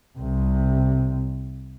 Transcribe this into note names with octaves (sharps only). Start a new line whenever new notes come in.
C2 C3